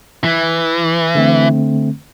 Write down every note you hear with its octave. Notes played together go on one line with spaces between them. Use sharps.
E3
D3 A3 C4